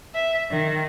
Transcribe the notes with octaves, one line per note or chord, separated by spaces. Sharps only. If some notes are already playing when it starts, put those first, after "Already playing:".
E5
D#3